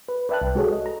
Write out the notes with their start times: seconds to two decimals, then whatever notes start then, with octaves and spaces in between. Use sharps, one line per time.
0.08 B4
0.29 B4 D5 E5 G5 A5 F#6
0.41 C2
0.55 G#3 F#4 G#4 A4 C#5
0.72 D#5
0.86 A#5